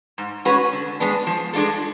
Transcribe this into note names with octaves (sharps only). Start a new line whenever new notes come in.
G#2
G#3 C#4 F#4 B4
D3
G#3 B3 D4
F3
G#3 D4 F4 A4